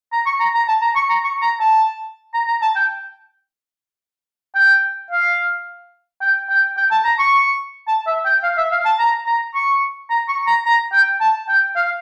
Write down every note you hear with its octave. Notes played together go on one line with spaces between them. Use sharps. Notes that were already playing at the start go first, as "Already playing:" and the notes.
A#5
C#6
A#5
A#5
A5
A#5
C#6
A#5
C#6
A#5
A5
A#5
A#5
A5
G5
G5
F5
G5
G5
G5
A5
A#5
C#6
A5
E5
G5
F5
E5
F5
A5
A#5
A#5
C#6
A#5
C#6
A#5
A#5
G5
A5
G5
F5